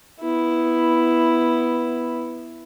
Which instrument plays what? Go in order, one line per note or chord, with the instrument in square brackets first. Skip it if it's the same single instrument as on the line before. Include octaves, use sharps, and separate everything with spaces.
[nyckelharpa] B3 E4